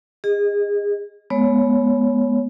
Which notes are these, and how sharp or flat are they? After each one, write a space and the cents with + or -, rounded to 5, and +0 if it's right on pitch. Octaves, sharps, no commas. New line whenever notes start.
G#4 -30 D#5 +0
G#3 +35 B3 +0 C#5 +0